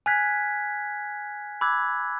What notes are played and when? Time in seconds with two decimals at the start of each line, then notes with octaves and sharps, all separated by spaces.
0.06 G#5 F6 F#6 G#6 B6
1.61 B5 D6 E6 F#6 G#6